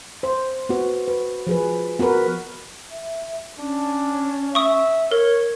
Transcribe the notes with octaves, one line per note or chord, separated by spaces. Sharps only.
C5
B3 F#4
B4
F3 G#4 B4
B3 F#4 A#4 B4
E5
C#4 D4
E5 C#6 D#6
A#4 C#5